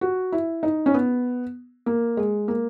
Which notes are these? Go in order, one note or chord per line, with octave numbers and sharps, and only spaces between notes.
F#4
E4
D#4
C#4
B3
A#3
G#3
A#3